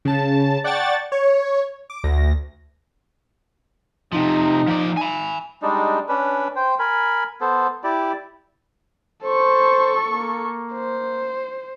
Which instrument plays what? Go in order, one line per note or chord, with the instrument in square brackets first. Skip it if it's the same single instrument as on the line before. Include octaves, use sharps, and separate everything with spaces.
[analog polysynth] C#3 A5
D5 F#5 G5 A5 C#6 A6
C#5
D6
D2 A#6
[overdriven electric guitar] C3 F3 [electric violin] D#4
[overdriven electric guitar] F3 D5
G#5 B5
[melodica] G3 G#3 D4 D#4
C#4 D4 B4
C5 G5
A#4 G#5 B5
B3 A4 C5
E4 G4 D5
[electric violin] A4 C#6 [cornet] C5
[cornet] A#3
[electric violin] C5